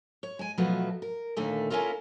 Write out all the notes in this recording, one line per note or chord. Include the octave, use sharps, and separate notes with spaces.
C#5
G#3 G#5
B2 F3 F#3 A3 B3 F#4
A#4
D#2 A#2 D3 A3 D5
A#3 C#4 E4 F4 A4 A#4